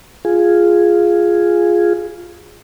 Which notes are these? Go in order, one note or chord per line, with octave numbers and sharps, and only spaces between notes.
F4 G#4